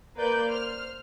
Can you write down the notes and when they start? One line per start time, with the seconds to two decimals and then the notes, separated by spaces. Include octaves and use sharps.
0.16 A#3 B4 D5 G6
0.46 C5 F6